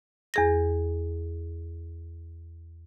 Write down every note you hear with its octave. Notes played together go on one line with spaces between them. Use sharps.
E2 G#4 A#6